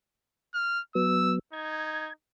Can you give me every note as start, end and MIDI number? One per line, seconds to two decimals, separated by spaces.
0.54 0.80 89
0.95 1.39 54
0.95 1.39 59
0.95 1.35 88
1.53 2.11 63
1.53 2.13 92